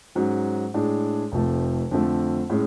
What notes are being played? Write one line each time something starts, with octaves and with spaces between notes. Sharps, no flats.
G#2 F#3 C#4
A2 G#3 D4
F1 F2 F3 A3
F2 D3 F3 A3
A2 G#3 C#4